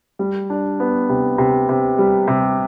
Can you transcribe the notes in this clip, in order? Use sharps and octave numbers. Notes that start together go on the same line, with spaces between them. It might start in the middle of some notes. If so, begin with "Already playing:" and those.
G3
D4
B3
C3
C3
C3
G3
C3